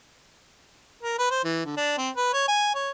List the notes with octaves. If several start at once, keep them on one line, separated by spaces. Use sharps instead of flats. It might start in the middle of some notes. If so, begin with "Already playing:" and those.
A#4
B4
C5
E3
D3
D4
C4
B4
C#5
G#5
C#5